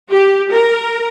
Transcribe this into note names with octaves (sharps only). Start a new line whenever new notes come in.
G4
A#4